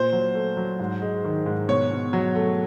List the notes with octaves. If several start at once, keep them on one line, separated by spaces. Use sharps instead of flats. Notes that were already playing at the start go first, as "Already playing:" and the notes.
Already playing: A#2 C5
F#3
A3
F#3
G#2
G#3
D#3
G#2
B2 C#5
B2
F#3
A3